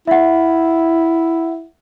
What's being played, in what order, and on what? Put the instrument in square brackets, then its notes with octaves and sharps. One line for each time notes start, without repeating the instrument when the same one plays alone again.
[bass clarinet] E4 [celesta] E5 F#5